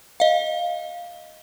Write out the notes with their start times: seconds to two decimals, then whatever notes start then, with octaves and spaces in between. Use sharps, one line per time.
0.20 D#5 F5